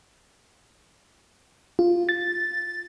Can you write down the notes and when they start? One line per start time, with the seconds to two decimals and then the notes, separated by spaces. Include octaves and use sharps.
1.79 F4
2.09 A6